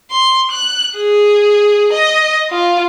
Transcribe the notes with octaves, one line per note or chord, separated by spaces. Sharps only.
C6
F#6
G#4
D#5
F4